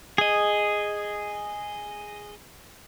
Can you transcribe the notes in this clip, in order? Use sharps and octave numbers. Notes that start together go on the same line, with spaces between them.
G#4 D#5